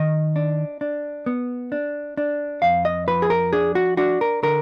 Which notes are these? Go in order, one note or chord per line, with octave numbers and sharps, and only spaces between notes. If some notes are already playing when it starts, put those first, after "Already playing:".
Already playing: D#3 D#5
D4
D4
B3
D4
D4
F2 F5
D#5
F3 B4
G#4
A#4
D4 G#4
F#4
D4 F#4
A#4
D3 A#4